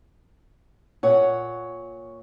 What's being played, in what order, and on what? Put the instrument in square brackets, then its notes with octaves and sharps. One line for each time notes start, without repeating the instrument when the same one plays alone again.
[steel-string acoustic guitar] A#2 C#5 F#5